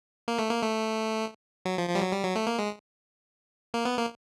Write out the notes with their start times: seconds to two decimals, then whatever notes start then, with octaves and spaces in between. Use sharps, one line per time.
0.28 A#3
0.39 A3
0.50 A#3
0.63 A3
1.65 F#3
1.78 F3
1.89 F3
1.95 G3
2.01 F#3
2.12 G3
2.24 F#3
2.36 A3
2.47 A#3
2.59 G#3
3.74 A#3
3.85 B3
3.98 A#3